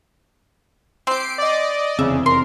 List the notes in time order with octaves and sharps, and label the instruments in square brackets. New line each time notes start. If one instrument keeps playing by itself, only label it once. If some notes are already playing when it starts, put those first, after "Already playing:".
[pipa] C4 G4 [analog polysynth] C7 D7
[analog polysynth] D5 D#5
[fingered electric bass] F1 E2 C4 [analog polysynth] C#3 [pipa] E5
[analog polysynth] A#4 [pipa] C6